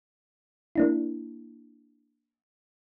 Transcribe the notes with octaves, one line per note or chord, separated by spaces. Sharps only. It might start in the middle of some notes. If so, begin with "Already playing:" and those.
A#3 D4 E4